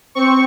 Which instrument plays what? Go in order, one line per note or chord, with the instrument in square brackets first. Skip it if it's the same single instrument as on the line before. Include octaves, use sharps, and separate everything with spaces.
[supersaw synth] C4 C#6